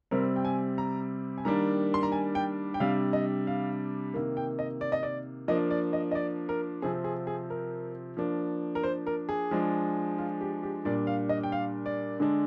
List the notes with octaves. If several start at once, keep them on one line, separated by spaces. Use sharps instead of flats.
C3 G3 C4 A#4
G5
G#5
A#5
G#5
D#3 G3 A#3 D4 A#5
C6
A#5
G#5
G5
G5
C3 G3 D4 F5
D#5
F5
C3 D#3 A#3
G5
D#5
D5
D#5
D5
F3 A#3 D4 D#5
D5
D#5
D#5
D5
A#4
C3 F3 C4 G#4
G#4
G#4
A#4
F3 A#3 D4
A#4
C5
A#4
G#4
F3 G#3 D4
F4
G4
G4
A#2 G3 D4 D5
F5
D#5
G5
F5
D5
D3 G#3 D4